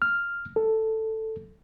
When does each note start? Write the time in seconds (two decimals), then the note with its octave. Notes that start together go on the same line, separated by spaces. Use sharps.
0.02 F6
0.56 A4